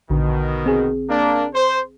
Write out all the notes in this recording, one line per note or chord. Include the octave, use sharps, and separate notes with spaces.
A#1 B2 D3 D#3
C4 G#4
A#3 D4
C5